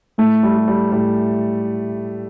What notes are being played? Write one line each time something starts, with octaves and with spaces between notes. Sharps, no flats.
A2 A3
G3
G3
G3
A2 G3